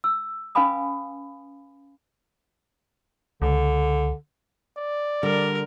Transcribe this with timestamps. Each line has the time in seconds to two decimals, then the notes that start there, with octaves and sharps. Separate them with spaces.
0.04 E6
0.55 C#4 B4 F5 G#5 B5 D#6
3.42 C#2 D3
4.77 D5
5.23 D3 G3 A#4